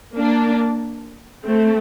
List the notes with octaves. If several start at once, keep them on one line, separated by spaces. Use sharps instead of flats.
A#3 D4
A3 C4